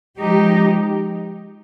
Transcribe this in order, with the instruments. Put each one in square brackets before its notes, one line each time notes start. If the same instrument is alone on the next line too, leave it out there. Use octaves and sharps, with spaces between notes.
[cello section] F3 G#3 D#4 G4